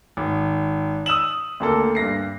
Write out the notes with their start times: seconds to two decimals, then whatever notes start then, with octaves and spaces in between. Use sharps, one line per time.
0.17 G#1
1.06 D#6 E6 E7 F#7
1.60 D2 A#3 A4
1.95 G2 A#6 C7